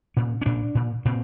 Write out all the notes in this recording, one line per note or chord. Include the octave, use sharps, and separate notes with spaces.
A#2 C#4
C#4
A#2 D4
A#2
A#2 C4